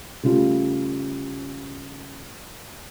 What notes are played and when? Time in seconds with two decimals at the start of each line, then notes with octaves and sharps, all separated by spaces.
0.23 C#3 G3 A3 F4 G4